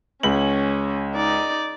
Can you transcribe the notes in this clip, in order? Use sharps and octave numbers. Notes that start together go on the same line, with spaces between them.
C#2 C#4 F#7
D#4 D5